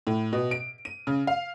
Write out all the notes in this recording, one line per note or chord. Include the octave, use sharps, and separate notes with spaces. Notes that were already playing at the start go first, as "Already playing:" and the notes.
A2
B2
D7
D#7
C#3
F5